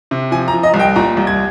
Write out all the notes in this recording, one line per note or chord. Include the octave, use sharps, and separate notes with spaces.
C3
F3 G#5
A#5
F3
D#5
C2
G5
A#2 A#5
C2
G#6